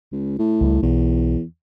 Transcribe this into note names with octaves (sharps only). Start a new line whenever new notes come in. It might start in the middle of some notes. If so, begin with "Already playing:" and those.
C#2
A2
C#2 G3
B1 E2